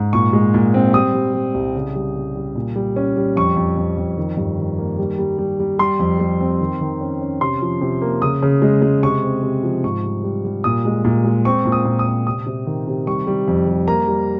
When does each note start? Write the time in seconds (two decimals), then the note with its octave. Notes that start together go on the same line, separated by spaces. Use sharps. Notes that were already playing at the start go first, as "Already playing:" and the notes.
Already playing: G#2
0.13 A#2 C#6
0.33 G#3
0.54 A#2
0.74 C4
0.93 G3 D#6
1.14 G3
1.34 G3
1.54 C2
1.75 C#3
1.96 G3
2.16 G3
2.36 G3
2.55 A#2
2.76 G3
2.96 C#4
3.17 G3
3.36 F2 C#6
3.57 F2
3.77 F2
3.97 F2
4.17 D#3
4.37 G2
4.58 D#3
4.78 A#3
4.99 G3
5.19 G3
5.38 G3
5.59 G3
5.79 G3 C6
5.99 F2
6.20 G3
6.40 C4
6.60 D#3
6.81 D#3
7.01 C#4
7.21 C#4
7.41 C3 C6
7.62 F3
7.81 C3
8.02 A#3
8.22 C#3 D#6
8.43 C#3
8.62 G#3
8.82 G#3
9.03 C3 C#6
9.23 C4
9.43 C3
9.63 F3
9.84 G#2 C#6
10.04 G3
10.23 G3
10.45 G3
10.64 A#2 D#6
10.85 G#3
11.04 A#2
11.24 G#3
11.45 C4 C#6
11.65 A#2
11.72 D#6
11.85 A#2
11.99 D#6
12.06 C4
12.26 C3 D#6
12.47 C3
12.67 D#3
12.87 C3
13.07 G3 C#6
13.27 G3
13.48 F2
13.67 G3
13.88 A#3 A#5
14.08 G3